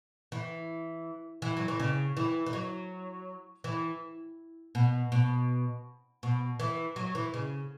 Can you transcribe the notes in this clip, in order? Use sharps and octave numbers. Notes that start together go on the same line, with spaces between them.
E3
E3
F#3
E3
C#3
E3
E3
F#3
E3
B2
B2
B2
E3
F#3
E3
C#3